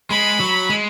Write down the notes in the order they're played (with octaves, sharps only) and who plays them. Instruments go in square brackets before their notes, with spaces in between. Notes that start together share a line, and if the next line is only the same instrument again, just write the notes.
[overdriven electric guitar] G#3 [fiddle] B5
[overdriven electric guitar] F#3
G#3